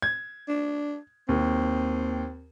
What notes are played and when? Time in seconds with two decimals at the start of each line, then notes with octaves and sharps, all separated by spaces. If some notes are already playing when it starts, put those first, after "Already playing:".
0.02 G#6
0.49 D4
1.29 D#2 C4